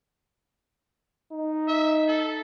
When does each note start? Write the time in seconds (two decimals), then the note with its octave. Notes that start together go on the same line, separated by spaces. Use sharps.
1.32 D#4
1.68 E5
2.08 A4